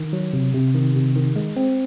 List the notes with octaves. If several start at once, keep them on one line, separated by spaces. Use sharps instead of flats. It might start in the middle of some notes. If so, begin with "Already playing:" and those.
Already playing: D#3
F#3
C3
C3
D#3
C3
D#3
G#3
C4